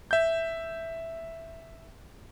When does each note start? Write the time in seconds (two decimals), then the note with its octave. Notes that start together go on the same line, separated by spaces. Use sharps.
0.11 E5 G6